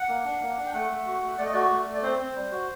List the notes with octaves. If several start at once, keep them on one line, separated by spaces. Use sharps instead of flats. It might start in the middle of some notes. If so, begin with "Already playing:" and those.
Already playing: F#5
A#3
D4
A#3
D4
G5
A3 F#5
A3
F#4
A3
A3 D5
D#5
F#4 D5
A3
A3
D5
C4 C5
C4
G3
F#4